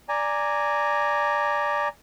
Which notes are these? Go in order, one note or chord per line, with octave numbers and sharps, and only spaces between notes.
D5 G#5 A#5